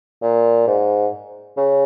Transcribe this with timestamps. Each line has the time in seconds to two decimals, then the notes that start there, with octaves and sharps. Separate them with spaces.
0.22 A#2
0.67 G#2
1.57 C#3